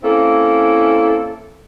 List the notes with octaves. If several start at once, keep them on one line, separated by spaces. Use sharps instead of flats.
A#3 C4 C#4 E4 A4